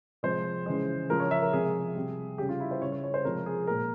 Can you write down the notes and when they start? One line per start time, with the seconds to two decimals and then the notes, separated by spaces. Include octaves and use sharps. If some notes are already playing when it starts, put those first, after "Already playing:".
0.23 C3 F3 G#3 C5
0.66 C#3 E3 G#3
1.09 C#3 F3 G#3 A#4
1.20 C#5
1.31 E5
1.42 A#4
1.53 C3 F3 G#3 G#4
1.95 C3 G3
2.38 C#3 G3 G4
2.49 F4
2.60 E4
2.71 C5
2.81 C#3 G3 C#5
2.92 C#5
3.04 C#5
3.14 C5
3.24 C3 F3 G#3 A#4
3.46 G#4
3.67 A#2 G#3 A#4